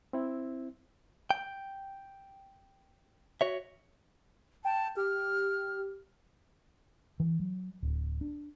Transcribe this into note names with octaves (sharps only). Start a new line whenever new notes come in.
C4 E4
G5
F#4 C#5 E5
G5 A5
G4 F6
E3
F#3
D1
D4